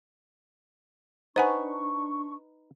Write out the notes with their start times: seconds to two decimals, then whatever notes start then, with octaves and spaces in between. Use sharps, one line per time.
1.36 D4 D#4 B4 C5 F#5 G#5 C#6